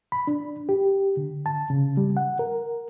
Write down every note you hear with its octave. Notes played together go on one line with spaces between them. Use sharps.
B5
D4
G4
D3
A5
C#3
G3
F#5
A#4